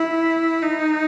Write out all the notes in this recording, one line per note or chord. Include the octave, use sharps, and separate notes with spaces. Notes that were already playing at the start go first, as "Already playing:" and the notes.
Already playing: E4
D#4